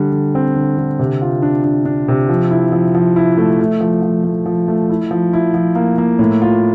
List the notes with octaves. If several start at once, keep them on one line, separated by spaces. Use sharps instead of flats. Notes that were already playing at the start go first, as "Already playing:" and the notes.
Already playing: D3 G3
D3
C4
D3
D3
C3
F4
D4
D4
D4
C3
F3
E4
F3
F3
E4
A3
A3
F3
F3
A3
F3
A3
E4
F3
E4
F3
A#3
A#3
A2
F4